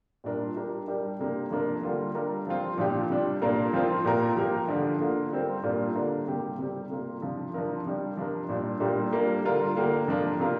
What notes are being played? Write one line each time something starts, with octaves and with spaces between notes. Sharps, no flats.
A#2 G3 D4 F4 A#4
G3 D4 G4 A#4
G3 D4 G4 A#4
C3 A#3 D4 G4
F3 A#3 D4 A#4
D3 G3 A#3 F4 A#4
G3 D4 A#4
F3 C4 F4
A#2 F3 D4 G4
C3 G3 D4
A#2 A#3 D4 A#4
F3 C4 F4 A#4
A#2 A#3 G4 A#4
F3 A#3 G4 A#4
D3 F3 D4
D3 A#3 F4
G3 C4 A#4
A#2 G3 A#3 D4 F4
D3 A#3 D4 A#4
C3 G3 A#3 G4
C3 G3 C4 G4
C3 A#3 F4 A#4
C3 F3 D4
F3 D4 F4 A#4
C3 G3 D4
F3 D4 A#4
A#2 G3 D4
A#2 G3 A#3 D4 G4
G3 A#3 D4 A#4
D3 G3 D4 F4 A#4
D3 A#3 G4 A#4
C3 F3 A#3 D4 F4
C3 A#3 F4 A#4